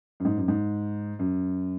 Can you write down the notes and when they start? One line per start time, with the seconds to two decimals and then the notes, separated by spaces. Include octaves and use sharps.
0.20 F#2
0.25 G#2
0.37 F#2
0.48 G#2
1.19 F#2